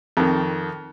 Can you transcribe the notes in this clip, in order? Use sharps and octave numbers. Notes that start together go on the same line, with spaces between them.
F2 D#3